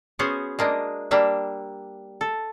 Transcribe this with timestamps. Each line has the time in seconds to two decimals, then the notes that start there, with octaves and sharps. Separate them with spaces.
0.19 B3 C#4 F#4 G#4 C5
0.59 G#3 A#3 D4 D#5
1.11 G3 A#3 D4 E5
2.21 A4